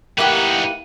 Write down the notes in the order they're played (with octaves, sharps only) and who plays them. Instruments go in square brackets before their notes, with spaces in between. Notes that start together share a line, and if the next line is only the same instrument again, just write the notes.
[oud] A#3 E4 G4 [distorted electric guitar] D#4 B4 [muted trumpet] F#5